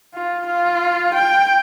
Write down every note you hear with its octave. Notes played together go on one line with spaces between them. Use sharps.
F4
F4
G5